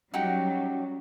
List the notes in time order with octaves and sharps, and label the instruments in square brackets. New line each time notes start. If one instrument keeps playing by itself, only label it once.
[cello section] F#3 G3 [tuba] C#4 [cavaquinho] D#4 F#4 G4